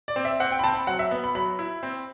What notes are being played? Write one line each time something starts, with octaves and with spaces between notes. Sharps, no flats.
D5
C4
E5
C4 F#5
G5
B5
C4 A5
B5
F#3 F#5
E5
B3
B5
F#3 B5
E4
C4